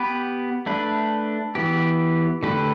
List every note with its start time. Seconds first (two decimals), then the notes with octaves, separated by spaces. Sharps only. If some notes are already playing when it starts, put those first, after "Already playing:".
Already playing: B3 G4 B4
0.66 A3 D4 B4
1.55 E3 B3 G4
2.43 D3 A3 G4 B4